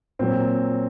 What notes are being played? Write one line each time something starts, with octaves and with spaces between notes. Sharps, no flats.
A#2 F#3 C4